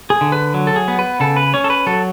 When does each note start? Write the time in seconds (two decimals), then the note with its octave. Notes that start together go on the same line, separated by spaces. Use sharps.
0.10 G#4
0.21 D3
0.32 B4
0.54 F#3
0.67 A4
0.76 G#4
0.88 B3
0.99 B4
1.20 C#3 A4
1.37 B4
1.54 C#4 C#5
1.64 A4
1.70 B4
1.87 F#3 A4